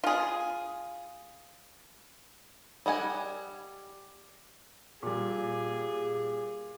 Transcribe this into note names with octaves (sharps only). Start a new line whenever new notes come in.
F4 G#4
G3 D#5 F#5 G#5
A#2 G3 G#4